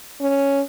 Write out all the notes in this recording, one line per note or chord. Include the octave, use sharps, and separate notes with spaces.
C#4